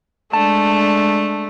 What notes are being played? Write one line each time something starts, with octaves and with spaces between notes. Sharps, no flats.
G#3 A3 D4 A5